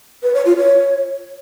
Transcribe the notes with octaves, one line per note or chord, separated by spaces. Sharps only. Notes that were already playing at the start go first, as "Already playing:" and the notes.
B4
C#5
F4
C#5